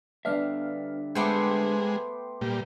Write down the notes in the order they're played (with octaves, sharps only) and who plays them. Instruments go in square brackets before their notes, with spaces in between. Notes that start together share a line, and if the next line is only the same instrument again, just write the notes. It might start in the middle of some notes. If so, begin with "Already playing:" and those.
[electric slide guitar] D3 G3 E5 [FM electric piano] B3 D4 F5
[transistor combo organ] G#3 [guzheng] A3 B3 C5 [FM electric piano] G5 C6 D6
[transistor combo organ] A#2 G3